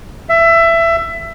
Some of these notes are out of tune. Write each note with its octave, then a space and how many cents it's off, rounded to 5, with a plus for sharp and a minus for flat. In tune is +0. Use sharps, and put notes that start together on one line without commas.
E5 +20